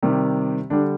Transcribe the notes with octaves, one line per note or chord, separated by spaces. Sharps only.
C3 D#3 G3
D3 G3 D4